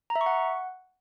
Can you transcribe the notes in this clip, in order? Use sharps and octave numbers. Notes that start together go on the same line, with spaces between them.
A#5
E5
C#6
F#5